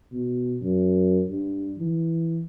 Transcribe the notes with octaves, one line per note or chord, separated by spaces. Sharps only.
B2
F#2
G2
E3